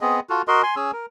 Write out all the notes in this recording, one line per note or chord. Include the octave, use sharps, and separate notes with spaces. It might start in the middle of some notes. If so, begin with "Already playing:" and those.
B3 C4 G#4 D#5
F4 F#4 A4
F#4 A#4 D#5 C6
G#5 C6
C#4 G#4 G#5 E6
A#4